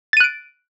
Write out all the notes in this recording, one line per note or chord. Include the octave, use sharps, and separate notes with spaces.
F#6 A6 D7 D#7